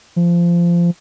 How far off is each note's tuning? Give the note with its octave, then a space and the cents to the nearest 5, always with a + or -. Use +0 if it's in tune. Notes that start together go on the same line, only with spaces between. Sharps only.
F3 -20